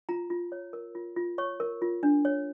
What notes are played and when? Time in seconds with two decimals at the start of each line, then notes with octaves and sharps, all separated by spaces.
0.09 F4 A#5
0.30 F4
0.52 C#5
0.73 A#4
0.95 F4
1.17 F4
1.38 C#5 C#6
1.60 A#4
1.82 F4
2.03 D4
2.25 C#5